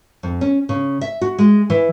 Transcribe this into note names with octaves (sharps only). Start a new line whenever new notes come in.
F2
C#4
C#3
E5
F#4
G#3
E3